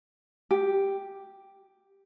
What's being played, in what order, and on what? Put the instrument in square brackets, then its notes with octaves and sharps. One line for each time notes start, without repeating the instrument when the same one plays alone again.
[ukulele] G4